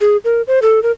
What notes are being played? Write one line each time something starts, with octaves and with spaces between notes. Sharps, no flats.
G#4
A#4
C5
A4
A#4